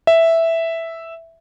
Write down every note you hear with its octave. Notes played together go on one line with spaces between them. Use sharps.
E5